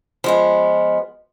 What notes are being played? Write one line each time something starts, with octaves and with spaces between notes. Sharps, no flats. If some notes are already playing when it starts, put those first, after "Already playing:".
F3 G#3 B3